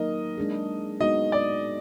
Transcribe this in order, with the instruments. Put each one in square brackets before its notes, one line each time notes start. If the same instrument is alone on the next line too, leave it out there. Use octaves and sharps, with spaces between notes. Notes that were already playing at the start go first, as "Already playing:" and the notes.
Already playing: [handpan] F#3 A#3 D#4 A#4 [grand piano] D#5
[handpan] G#3 D4 G#4
[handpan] G#3 B3 D#4 F#4 [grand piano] D#5
[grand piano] D5